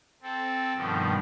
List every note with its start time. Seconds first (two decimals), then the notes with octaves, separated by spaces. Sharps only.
0.22 C4 A4
0.76 G2 B2 D#3 F3